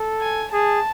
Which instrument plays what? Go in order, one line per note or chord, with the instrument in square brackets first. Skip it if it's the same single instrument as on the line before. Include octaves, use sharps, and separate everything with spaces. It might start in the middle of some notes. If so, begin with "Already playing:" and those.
Already playing: [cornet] A4
[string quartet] G#5
[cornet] G#4 [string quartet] A5